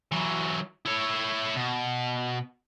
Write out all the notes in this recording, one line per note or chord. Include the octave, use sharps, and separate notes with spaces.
E3 F#3
E4 C#5
B2